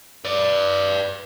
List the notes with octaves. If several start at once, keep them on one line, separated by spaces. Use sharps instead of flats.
B4 D5